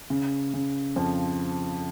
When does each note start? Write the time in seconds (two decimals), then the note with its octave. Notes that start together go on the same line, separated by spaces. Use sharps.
0.10 C#3
0.54 C#3
0.96 F2 F3